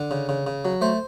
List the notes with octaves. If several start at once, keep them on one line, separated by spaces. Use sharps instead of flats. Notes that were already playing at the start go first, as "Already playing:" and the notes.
Already playing: D3
C#3
C#3
C#3
F#3
A3 C5